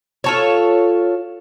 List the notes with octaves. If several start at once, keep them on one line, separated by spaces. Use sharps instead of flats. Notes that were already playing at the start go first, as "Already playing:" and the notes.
F4 A4 C#5